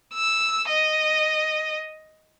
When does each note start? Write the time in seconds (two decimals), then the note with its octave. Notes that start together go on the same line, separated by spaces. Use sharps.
0.14 E6
0.68 D#5